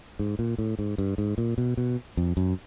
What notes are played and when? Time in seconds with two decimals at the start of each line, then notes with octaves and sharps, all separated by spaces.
0.19 G#2
0.39 A#2
0.58 A2
0.79 G#2
0.98 G2
1.18 G#2
1.38 A#2
1.58 B2
1.77 B2
2.17 F2
2.37 F#2